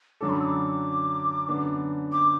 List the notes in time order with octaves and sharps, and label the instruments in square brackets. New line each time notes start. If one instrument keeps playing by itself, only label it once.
[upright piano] F#2 D3 F#3 D4 A4 [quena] D6
[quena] B5
E6
D6
[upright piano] F#2 D3 B3 D4 B4
[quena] D6